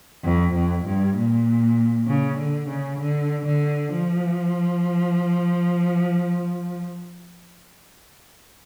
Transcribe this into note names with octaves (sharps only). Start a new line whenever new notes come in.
F2
F2
G2
A#2
C#3
D3
C#3
D3
D3
F3